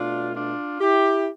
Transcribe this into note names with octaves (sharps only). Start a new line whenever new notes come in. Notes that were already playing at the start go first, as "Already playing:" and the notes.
Already playing: B2 A3 D4 F4
D4 F4
E4 G4